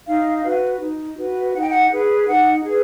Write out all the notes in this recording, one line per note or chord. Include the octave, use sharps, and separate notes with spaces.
D#4 F5
F#4 B4
D#4
F#4 B4
D#4 F#5
G5
F#5
G#4 B4
D#4 F#5
G#4 B4